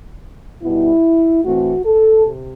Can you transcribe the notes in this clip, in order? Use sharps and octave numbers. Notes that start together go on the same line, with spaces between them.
B2 G3 B3 E4
A2 E3 A3 C4 F#4
A4
C3